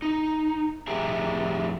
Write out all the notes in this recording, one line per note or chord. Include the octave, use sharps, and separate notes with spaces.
D#4
F2 A2 G4 G#4 E5 A#5